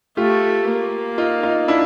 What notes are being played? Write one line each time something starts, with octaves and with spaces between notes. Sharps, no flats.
A3 F4 G4
A#3
D#4 F4
D#4 F4
D4 E4